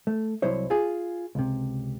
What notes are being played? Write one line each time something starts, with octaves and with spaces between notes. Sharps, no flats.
A3
C2 C3 F#3 E4 C5 C#5
F4 G#4
C#2 C3